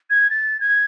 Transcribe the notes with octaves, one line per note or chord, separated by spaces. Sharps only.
G#6
A6
G#6